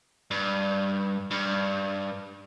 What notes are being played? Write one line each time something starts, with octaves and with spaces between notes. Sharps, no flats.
G2
G2